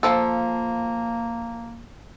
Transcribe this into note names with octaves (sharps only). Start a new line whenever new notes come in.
F3 A#3 A4